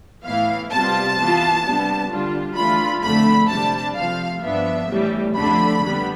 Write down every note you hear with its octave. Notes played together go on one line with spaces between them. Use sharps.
A2 E3 B3 E4 F5
C3 G3 B3 F4 A5
E3 B3 F4
C3 G3 B3 D4
D3 G3 D4 F4
E3 A3 D4 F4 B5
F2 D3 A3 B5
C3 G3 D4 A5
C3 F3 A3 F5
G2 F3 B3 D4 E5
A2 E3 G3
F2 D3 A3 D4 B5
D3 G3 B3